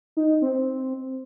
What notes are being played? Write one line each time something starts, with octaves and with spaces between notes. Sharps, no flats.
D#4
C4